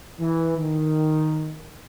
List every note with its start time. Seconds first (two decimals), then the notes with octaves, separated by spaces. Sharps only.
0.20 E3
0.58 D#3